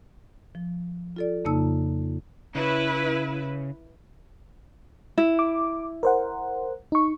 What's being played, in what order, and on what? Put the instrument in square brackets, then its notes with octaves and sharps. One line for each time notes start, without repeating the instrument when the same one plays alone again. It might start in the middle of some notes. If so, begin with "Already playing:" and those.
[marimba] F3
F4 A4 D5
F2 C#3 A#3 D#4 A5 E6
[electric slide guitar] C#3 [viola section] E4 B4
[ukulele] E4
[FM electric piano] D6
A#4 C5 F#5
D#4 C#6